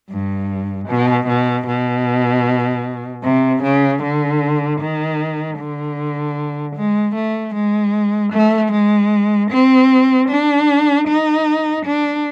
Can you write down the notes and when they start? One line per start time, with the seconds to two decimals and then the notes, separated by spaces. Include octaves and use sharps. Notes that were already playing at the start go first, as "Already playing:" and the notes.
0.10 G2
0.88 B2
1.28 B2
1.67 B2
3.24 C3
3.63 C#3
4.02 D3
4.80 D#3
5.59 D3
6.76 G#3
7.15 A3
7.55 G#3
8.33 A3
8.72 G#3
9.51 C4
10.29 D4
11.08 D#4
11.85 D4